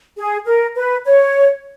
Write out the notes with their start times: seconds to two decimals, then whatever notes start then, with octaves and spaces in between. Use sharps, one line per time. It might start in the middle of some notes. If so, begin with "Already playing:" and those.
0.17 G#4
0.46 A#4
0.76 B4
1.05 C#5